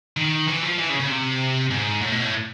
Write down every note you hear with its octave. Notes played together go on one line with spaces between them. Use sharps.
D#3
E3
F3
E3
C#3
C#3
C3
G#2
A2
B2
A2